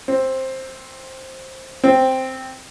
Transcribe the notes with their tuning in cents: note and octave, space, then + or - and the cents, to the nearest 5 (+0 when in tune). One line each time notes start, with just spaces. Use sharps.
C4 +10
C4 +0